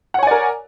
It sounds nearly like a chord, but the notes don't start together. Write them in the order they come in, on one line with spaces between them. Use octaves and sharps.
F#5 C#5 G#5 D5 A#4